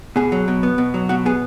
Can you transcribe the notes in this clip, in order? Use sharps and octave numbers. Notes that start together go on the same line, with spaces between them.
B2 G#4
F#3
B2
B3
B2
F#3
B2 F#4
B3 G#4